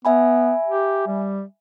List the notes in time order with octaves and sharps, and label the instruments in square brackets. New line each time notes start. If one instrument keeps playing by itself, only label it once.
[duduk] B3 [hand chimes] E5 G#5 B5
[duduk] G4
G3